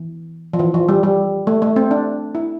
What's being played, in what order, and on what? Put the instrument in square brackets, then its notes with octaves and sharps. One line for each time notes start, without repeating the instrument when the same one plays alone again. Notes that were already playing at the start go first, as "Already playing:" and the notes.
Already playing: [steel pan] E3
F3
E3
F3
G3
G3
A3
A3
C4
D4
E4